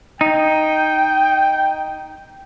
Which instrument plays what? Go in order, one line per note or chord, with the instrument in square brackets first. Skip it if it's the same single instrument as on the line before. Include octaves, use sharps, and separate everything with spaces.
[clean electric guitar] D#4 [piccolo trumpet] G5